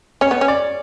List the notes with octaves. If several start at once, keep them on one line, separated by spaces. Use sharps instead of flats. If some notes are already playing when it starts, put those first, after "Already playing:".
C#4 C#5
B3
C#4
D5